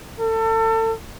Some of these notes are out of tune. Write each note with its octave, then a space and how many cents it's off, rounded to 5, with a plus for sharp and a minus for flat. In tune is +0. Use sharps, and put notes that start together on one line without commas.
A4 +30